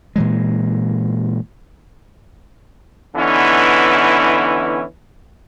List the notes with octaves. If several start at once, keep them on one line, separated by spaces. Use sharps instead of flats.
A#2 E3 G#3
D3 E3 B3 C#4 D#4 E4